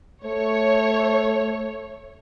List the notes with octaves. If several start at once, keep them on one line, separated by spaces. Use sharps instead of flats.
A3 C#5